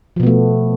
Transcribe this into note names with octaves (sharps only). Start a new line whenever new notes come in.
B2 F3 A3 B3